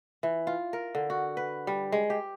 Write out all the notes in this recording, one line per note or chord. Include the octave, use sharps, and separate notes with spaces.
E3
F4
A#4
D3
F#4
B4
G3
G#3
G4